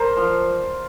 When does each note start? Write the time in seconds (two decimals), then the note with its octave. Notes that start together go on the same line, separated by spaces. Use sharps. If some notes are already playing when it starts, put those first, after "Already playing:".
Already playing: A#4 C5 D5
0.17 F3